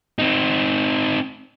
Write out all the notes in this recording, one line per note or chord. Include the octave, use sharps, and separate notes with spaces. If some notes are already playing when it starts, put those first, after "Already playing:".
C4 D#4